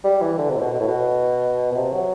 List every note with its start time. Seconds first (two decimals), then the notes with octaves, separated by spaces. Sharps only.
0.04 G3
0.21 E3
0.38 D3
0.50 C3
0.56 A2
0.61 B2
0.73 B2
0.80 A2
0.88 B2
1.72 B2
1.76 C3
1.93 F#3